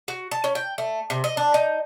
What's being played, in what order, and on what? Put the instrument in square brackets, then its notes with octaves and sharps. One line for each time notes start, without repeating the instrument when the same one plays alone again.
[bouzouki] F#4
A5
C#4
G5
A3
C3
D#5
D4
D#4